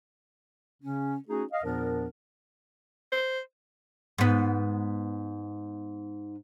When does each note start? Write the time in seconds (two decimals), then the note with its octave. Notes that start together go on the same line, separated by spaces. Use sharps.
0.83 C#3 C#4
1.28 A3 C#4 D#4 F#4 G#4
1.52 D#5 F5
1.64 E2 A#2 F3 B3 D4 A#4
3.12 C5
4.18 G#2 B3